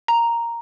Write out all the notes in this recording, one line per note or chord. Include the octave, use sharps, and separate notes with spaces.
A#5